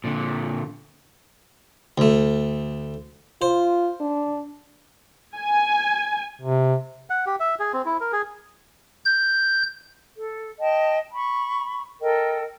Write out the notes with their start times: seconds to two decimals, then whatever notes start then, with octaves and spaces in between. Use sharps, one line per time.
0.04 A#2 D3
1.98 D2 A3
3.42 F4 C5
4.01 D4
5.37 G#5
6.42 C3
7.10 F#5
7.27 G4
7.40 E5
7.60 G#4
7.73 C4
7.86 E4
8.01 A#4
8.12 G#4
9.05 G6
10.16 A4
10.60 D#5 G5 A5
11.13 B5 C#6
12.01 A4 A#4 D#5 G5